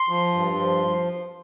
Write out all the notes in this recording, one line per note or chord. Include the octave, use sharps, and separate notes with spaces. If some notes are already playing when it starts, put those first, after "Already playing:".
Already playing: C6
F3
G2
F3